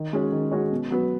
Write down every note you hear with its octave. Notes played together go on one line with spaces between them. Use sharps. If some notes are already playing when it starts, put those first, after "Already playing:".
Already playing: D#3
G#3 C#4 F#4 C#5
D#3
G#3 C#4 F#4 C#5
B2
F#3 B3